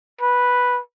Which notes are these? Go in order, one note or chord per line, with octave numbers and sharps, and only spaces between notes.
B4